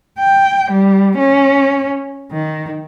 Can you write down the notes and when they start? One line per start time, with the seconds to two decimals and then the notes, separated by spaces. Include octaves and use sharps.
0.19 G5
0.71 G3
1.18 C#4
2.32 D#3